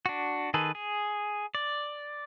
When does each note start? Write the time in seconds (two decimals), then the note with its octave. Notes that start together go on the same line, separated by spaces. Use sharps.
0.06 D4 F#4
0.54 D#3 G#4 A4 B4
0.75 G#4
1.55 D5